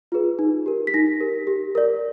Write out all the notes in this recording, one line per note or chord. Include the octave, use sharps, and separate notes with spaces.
F4 G#4 B4
D#4
G4 A#4
B6
D#4 A#6
G4 A#4
G4
A#4 D5